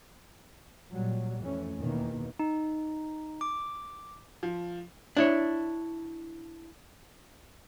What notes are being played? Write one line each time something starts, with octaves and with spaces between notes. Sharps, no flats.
A#2 F#3 G3
F2 E3 A3 C#4
E2 B2 D#3 E3 A#3
D#4
D6
F3
D4 E4 C#5